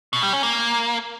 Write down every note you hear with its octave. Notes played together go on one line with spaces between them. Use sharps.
B2
G3
C#4
A#3